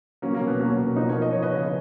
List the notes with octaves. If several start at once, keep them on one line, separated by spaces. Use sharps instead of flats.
F#3 A#3 C#4
A#3 C#4
B2
B3
F#3 A#3 C#4
B2
F3 B3 D#4
A#4 C#5
F3
D#5
F3 C#5
B4 D#5
C#3